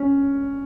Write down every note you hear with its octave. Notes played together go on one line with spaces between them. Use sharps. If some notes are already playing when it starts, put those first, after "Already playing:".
Already playing: C#4